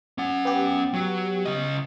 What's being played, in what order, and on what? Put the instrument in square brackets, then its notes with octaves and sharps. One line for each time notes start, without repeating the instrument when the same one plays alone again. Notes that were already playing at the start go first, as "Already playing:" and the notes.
[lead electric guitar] C#4 F#5
[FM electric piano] B3 G4
[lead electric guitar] F#3
C#3 D#5